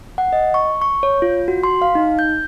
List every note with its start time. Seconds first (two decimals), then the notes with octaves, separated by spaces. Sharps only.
0.18 F#5
0.32 D#5
0.54 C#6
0.81 C#6
1.03 C#5
1.22 F4
1.48 F#4
1.63 C6
1.82 F5
1.95 D#4
2.19 G6